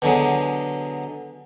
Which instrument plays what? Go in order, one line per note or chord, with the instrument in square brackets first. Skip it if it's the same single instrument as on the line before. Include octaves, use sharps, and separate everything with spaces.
[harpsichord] B2 D3 F#3 G#3